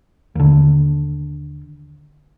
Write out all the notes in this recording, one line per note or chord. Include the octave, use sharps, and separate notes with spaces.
D#2 D3